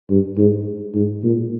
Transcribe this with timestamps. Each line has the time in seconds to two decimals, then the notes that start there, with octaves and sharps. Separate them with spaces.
0.10 G2
0.38 G#2
0.95 G#2
1.23 A#2